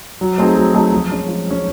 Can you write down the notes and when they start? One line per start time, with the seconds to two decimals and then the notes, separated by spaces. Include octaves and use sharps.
0.21 F#3
0.38 A3 C4 D#4 G#4
0.56 F#3
0.74 A3 C4 D#4 G#4
0.92 F3
1.11 G#3 C#4
1.28 F3
1.46 G#3 C#4